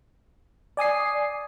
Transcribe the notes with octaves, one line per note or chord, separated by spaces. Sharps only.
D5 G#5 D#6 C7